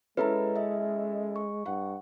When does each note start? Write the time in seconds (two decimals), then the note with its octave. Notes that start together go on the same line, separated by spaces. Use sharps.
0.17 G#3 C#4 E4 A4 B4 A#5
0.56 D#5 E5
1.36 C#6
1.66 G2 F#5